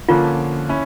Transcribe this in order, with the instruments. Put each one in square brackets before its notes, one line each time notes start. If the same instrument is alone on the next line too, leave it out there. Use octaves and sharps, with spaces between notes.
[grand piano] D3 F3 A#3 C#4 [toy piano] F4
[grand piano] C#4 E4